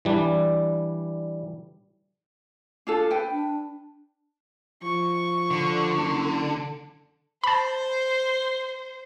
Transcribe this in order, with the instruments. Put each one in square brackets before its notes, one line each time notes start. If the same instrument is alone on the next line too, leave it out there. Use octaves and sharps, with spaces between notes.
[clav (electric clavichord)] E3 G3 D4
[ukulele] D4 F4 A4
B4 G5
[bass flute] D4
[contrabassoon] F3 [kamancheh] C#6
[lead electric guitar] D3
[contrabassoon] F#1
[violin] C5 [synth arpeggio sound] A5 B5